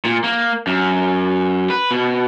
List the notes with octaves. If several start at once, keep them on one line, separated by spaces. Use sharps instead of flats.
A#2
A#3
F#2
B4
B2